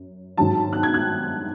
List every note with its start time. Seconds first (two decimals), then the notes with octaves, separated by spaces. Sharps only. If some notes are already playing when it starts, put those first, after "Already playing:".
Already playing: F#2
0.37 G#2 D#3 F#3 A5
0.73 F#6
0.83 G#6
0.94 F#6